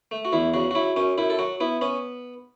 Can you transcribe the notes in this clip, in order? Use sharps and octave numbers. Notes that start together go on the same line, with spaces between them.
A3
F#4
E2 E4
C#3 F#4
F#4
F#3 E4
F#2 C#4
F#2 E4
A4
F#3 F#4
B3 E4
B3 C#4